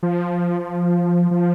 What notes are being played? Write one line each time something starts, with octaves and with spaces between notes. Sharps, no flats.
F3
F3